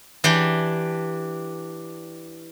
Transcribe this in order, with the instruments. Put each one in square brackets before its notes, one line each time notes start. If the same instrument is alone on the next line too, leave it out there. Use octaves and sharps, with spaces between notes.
[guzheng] E3 D4 G4